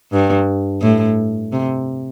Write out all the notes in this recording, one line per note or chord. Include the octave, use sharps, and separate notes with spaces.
G2
A2
C3